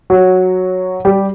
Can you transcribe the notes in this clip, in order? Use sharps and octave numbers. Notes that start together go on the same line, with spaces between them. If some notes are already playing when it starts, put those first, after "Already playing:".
F#3 F#4
G3 G4